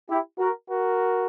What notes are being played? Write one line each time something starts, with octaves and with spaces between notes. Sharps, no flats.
E4 G4
F#4 A#4
F#4 A#4